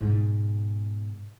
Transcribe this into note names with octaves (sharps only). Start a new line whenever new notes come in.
G#2 B2